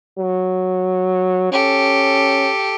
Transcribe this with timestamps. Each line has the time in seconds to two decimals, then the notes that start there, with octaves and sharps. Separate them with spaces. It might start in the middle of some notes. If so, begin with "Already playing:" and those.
0.19 F#3
1.52 C#4 G4 A4